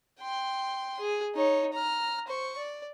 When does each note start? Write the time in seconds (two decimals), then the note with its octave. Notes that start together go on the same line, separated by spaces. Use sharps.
0.20 G5 C6
0.99 G#4
1.35 D#4 C#5
1.73 A#5 F6
2.27 C5 C#6
2.57 D5